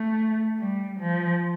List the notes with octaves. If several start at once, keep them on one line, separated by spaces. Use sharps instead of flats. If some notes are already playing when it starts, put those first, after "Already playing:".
Already playing: A3
G3
F3